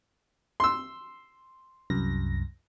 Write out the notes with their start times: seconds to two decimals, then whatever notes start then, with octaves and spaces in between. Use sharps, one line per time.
0.60 C6 E6
1.90 C2 F#2 A#6